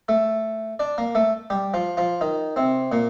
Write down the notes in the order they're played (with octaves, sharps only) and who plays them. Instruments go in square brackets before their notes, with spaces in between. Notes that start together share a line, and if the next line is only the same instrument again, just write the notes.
[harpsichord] A3 A4
D4 D5
A#3 A#4
A3 A4
G3 G4
F3 F4
F3 F4
D#3 D#4
C3 C4
A#2 A#3